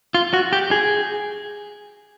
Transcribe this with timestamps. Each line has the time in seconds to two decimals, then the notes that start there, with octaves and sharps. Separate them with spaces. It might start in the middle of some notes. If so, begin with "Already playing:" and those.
0.14 F4
0.33 F#4
0.53 G4
0.71 G#4